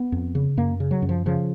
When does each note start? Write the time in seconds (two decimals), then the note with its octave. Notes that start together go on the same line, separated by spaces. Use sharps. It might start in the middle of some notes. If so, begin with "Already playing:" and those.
Already playing: B3
0.12 F2
0.35 C#3
0.57 F#2 A#3
0.80 C#3
0.91 F#3
1.02 F#2
1.09 F3
1.26 C#3 F3